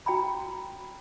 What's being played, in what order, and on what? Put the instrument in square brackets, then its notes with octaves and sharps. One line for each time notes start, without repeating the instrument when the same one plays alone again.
[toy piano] F#4 G5 A#5 B5